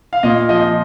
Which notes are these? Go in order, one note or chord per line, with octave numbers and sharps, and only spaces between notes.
F5
A#2 D#5
F3 D#5